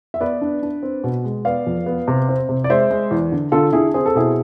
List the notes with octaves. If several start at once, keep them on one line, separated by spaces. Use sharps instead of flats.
E5
B3 B4 D5
D4
D4
C4
B2
G#3
B3 D5 F5
F2
B3
C3
C4
C3
D5
G#3 C5 E5
G#3
E2
D3
D3 F4 A4
D3 E4 G#4
C4 G#4
A4
B2 E4 G#4